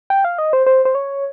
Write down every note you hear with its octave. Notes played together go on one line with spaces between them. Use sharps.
G5
F5
D#5
C5
C5
C5
C#5